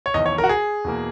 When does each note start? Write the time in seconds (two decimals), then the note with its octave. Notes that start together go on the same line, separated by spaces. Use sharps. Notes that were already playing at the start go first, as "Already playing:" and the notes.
0.06 C#5
0.14 F#1 E2 D#3 D#5
0.26 C#5
0.38 A#4
0.44 F#4
0.49 G#4
0.84 E2 B2 A#3